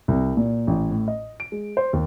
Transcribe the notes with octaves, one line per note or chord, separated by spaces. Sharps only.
C2
A#2
A1
A2
D#5
D7
G#3
C5
D#2